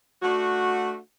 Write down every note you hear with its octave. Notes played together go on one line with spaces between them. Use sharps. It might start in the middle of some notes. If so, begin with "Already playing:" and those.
A3 D4 F#4